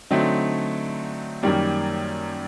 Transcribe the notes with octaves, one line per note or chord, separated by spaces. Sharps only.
D3 F#3 A3 C4 D#4
F#2 D#3 G3 A#3